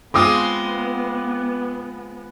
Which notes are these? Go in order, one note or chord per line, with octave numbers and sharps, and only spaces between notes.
G#3 B3 C4 F4 D6 D#6